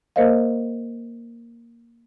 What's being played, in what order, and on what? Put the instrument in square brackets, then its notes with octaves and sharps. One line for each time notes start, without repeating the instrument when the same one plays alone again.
[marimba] A#3 A#4 C5 D#5 F5